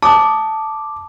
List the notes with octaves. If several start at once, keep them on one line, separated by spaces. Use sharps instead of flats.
A5 D6 D#6